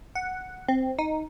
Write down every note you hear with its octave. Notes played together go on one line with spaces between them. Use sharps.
F#5
C4
D#4